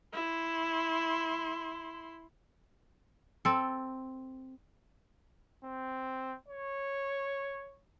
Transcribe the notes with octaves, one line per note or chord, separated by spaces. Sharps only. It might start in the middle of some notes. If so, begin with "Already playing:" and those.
E4 C6
C4 A4
C4
C#5